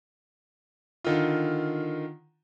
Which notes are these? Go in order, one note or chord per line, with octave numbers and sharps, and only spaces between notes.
D3 D#3 F4